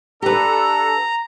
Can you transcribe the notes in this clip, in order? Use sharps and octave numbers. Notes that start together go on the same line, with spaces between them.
D4 G4 A4 B4 A#5